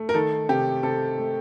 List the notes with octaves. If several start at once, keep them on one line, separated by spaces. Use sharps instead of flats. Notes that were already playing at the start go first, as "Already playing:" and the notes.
Already playing: A3
A#4
D#3 A4
C3 G4
C3 A4
A3